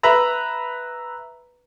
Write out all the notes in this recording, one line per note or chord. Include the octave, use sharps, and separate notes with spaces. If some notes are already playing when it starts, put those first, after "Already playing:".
B4 E5 A#5 B5